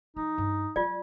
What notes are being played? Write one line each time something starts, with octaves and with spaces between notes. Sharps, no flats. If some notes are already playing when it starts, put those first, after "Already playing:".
F3 D#4
G2 D4
F#3 G#3 F4 D5